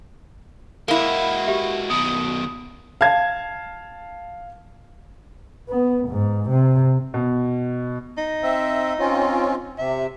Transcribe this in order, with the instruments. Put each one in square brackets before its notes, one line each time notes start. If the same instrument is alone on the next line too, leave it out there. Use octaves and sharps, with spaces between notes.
[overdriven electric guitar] G#3 F#4 [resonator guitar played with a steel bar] A#3 E4
[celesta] G4 E5
[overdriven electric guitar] B2 D#3 [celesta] D#6
[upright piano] F5 A5 G#6
[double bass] B3
G#2
C3
[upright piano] B2
[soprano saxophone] D#4
[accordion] C4 E5
C4 C#4 F4
[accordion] C3 [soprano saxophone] E5